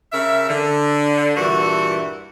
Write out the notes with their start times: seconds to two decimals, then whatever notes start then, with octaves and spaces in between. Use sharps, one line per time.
0.12 C#3 A#4 E5
0.49 D3
1.36 G2 A#2 E3 A3 F#4